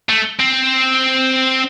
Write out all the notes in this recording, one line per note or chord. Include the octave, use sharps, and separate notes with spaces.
A3
C4